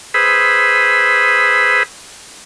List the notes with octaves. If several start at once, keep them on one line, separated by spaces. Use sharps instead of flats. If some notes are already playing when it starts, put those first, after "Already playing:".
G#4 B4 C5 B5 D#6 E6